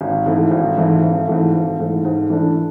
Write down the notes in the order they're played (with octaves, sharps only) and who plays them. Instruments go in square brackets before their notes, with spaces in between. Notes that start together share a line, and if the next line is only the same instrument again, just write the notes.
[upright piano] G#1
G#2 E3 A3 E4
G#1
G#2 E3 A3 E4
G#1
G#2 E3 A3
G#1
G#2 E3 A3
G#2
E3 A3 D4